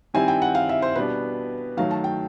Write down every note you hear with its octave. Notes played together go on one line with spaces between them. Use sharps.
D#3 G3 C4 E4 G#5
G5
F#5
F5
E5
C5
B2 G3 B3 D4 B4
D#3 F#3 A3 F5
A5
G5